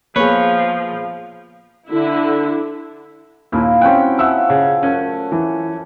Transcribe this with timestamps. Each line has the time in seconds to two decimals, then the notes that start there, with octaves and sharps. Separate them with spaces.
0.16 F3 A#3 B3 G#4 B4 C#5
1.89 D3 E4
3.52 D#2 A#2 E4 E5 F5
3.81 F#3 C4 C#4 F#4 G5 F#6
4.19 F3 C#4 E5 F#5 E6
4.49 C#3 C#5
4.83 F#2 A3 C#4
5.32 E3